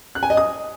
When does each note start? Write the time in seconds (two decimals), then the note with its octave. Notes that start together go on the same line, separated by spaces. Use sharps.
0.15 F#6
0.23 G#5
0.30 D#5
0.37 D#6